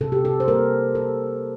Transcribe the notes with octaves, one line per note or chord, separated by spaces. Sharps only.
C3 A4
G4
A4
C5
G3 A#3 A#4
C3 A4